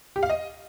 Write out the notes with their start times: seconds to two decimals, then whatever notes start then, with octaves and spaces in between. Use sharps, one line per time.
0.16 G4
0.23 F5
0.30 D#5